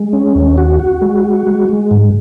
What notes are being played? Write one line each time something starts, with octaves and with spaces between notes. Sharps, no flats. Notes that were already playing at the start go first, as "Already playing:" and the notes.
Already playing: G#3
C#4
D#2
F#4
F#4
G#3
F#4
G#3
G#3
G#2